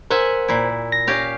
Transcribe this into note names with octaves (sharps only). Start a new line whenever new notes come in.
A#4 C5 E5 F#5 G#5
A#2 E4
A#6
C#4 G4 F5